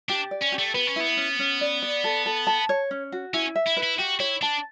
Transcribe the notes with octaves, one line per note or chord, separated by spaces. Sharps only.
D4 G4
D5
C#4
G4
A3
B3 B4
C#4
B3 E4
C#4
C#4
D5
D5
A4
A4
A5
C#5
C#4
F#4
C#4 E4
E5
E4
B4
E4
F#4 G4
E4 C#5
D4 A5